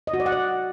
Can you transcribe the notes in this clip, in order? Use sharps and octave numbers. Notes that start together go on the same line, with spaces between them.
D#5
F#4
D5
F#5
D5